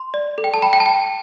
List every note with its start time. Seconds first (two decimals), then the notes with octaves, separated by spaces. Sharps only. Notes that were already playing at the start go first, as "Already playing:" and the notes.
Already playing: C6
0.14 D5
0.38 A4
0.44 G5
0.54 A5
0.62 G5 B5
0.73 G5
0.80 A5
0.86 G5